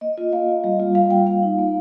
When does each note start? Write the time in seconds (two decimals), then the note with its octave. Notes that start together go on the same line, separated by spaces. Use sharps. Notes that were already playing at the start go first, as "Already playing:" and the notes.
0.01 A#3 D#5
0.18 F4 D#5
0.32 A#3 F5
0.49 F4
0.64 G3
0.80 A#3 F4
0.95 G3 F5
1.11 A#3 F4 G5
1.27 A#3 F5
1.43 D#4
1.59 A#3